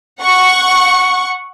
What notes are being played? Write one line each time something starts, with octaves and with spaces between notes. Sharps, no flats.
F#5 C#6